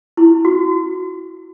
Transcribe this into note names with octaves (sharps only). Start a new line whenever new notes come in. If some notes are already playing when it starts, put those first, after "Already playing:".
E4
F#4